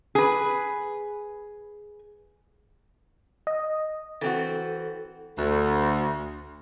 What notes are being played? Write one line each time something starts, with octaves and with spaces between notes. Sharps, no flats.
G#4 B4
D#5
E3 C4 F#4 A4
D2